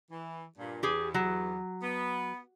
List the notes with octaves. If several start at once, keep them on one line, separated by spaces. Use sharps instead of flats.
E3
G2 A#2
E2 G4 G#4
F#3
B3